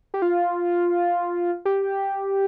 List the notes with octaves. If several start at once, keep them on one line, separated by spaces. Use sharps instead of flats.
G4
F4
G4